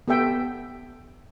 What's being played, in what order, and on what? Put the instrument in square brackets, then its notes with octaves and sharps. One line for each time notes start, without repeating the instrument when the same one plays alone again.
[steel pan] B3 G4 A4 E5 G5